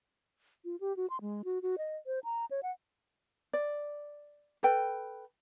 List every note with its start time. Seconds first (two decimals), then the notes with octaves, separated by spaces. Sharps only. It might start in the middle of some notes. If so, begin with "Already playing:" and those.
0.65 F4
0.80 G4
0.97 F#4
1.10 C6
1.21 G#3
1.45 F#4
1.62 F#4
1.78 D#5
2.07 C5
2.24 A#5
2.51 C#5
2.63 F#5
3.53 D5
4.63 A4 B4 G5